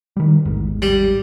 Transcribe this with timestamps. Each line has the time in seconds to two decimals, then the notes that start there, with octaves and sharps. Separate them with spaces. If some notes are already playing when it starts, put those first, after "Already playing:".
0.17 D#3 G3
0.45 A1 E2 G#2
0.82 G3